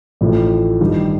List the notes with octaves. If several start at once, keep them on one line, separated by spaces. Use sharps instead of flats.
A1 A2 F3
G2 D#3 G3